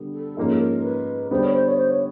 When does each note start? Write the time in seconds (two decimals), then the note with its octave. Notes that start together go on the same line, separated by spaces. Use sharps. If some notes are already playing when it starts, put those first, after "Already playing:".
Already playing: D3 G3 B3
0.13 A4
0.37 G#2 F3 A#3 C#4 A#4
0.48 A4
0.59 A#4
0.78 A#4
0.84 B4
1.31 D3 G3 B3 C5
1.43 C#5
1.54 C5
1.66 C#5
1.77 C5
1.89 C#5